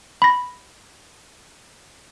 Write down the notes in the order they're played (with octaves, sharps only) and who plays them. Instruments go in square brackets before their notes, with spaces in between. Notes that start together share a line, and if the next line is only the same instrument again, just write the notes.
[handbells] B5 A#6